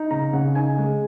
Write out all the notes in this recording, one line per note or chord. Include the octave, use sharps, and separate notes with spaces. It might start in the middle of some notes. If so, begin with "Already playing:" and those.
Already playing: D#4
C#3 A#5
C#3 F#5
D#4 G#5
G#3